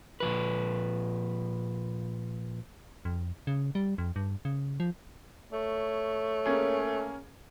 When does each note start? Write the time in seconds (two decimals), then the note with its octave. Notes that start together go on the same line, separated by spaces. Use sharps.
0.20 A#2 F3 B4
3.05 F2
3.47 C#3
3.75 G3
3.98 F2
4.16 G2
4.45 C#3
4.80 F3
5.53 A3 C#5
6.46 A#3 C#4 G#4